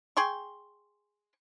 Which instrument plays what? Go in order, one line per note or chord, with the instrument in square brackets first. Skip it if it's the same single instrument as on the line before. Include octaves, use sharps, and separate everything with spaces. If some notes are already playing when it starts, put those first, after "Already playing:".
[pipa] G#4 G5 C6 C#6